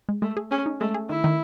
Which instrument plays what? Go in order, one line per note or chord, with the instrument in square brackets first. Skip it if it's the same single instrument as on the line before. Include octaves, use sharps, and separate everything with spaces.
[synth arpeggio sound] G#3
[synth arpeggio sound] G#3 [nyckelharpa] A3
[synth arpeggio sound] G#4
[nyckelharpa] C#4 [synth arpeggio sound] G#4
[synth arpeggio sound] D#4
[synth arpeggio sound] G#3 [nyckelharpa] A3
[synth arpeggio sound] G#4
[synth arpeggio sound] D#3 [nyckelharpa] E4
[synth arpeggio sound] D#3